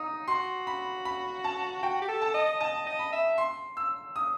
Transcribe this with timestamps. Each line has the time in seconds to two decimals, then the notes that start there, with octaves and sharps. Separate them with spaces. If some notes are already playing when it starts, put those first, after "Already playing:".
Already playing: D#4 D#6
0.28 F#4 C6
0.67 B5
1.05 B5
1.44 A5
1.83 F#4 G5
2.01 G4
2.08 A4
2.22 A5
2.34 D#5
2.61 D#5 A5
2.87 D#5
2.99 B5
3.12 E5
3.38 C6
3.77 E6
4.16 D#6